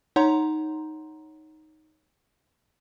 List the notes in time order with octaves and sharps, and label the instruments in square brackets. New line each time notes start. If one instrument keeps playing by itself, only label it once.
[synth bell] D#4 C#5 F#5 A#5 C6